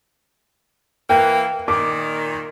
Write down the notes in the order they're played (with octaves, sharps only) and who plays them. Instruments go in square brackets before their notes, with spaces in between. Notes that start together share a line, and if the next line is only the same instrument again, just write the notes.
[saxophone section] E3 A#3 [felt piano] G5
[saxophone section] A#2 D#3 [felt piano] D6